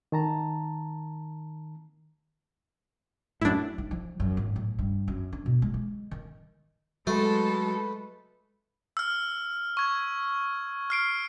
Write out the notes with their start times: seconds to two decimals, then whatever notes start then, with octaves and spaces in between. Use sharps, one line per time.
0.12 D#3 A5 A#5
3.41 F#2 A2 D4 E4
3.78 D#4
3.91 F3
4.20 F#2
4.37 G#1
4.56 A2
4.79 G2
5.08 F#2
5.33 D4
5.46 B2
5.62 G#3
5.74 G#3
6.11 D#3
7.07 F#3 G#3 A3 A4 B4
8.97 E6 F6
9.77 C#6 G#6
10.90 F6 C7 D7